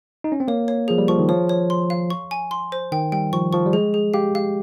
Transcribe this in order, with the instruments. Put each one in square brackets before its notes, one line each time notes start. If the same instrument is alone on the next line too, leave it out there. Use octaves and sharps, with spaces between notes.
[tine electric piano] D#4
C#4
C4
[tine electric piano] A#3 [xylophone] C#5
[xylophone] C#5
[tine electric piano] F3 [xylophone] G#4
[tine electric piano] G3
[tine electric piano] F3 [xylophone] C#6
[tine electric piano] D#3
[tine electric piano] F3 [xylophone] C#5
[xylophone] C#5
C6
F5
C#6
G#5
C6
C5
[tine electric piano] D#3 [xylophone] G5
[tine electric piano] G3 [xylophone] G5
[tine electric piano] F3 [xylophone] C#6
[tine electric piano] F3 [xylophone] C#6
[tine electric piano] G3
[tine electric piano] G#3 [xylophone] G#4
[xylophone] G#4
[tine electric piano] G4 [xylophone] F5
[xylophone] F5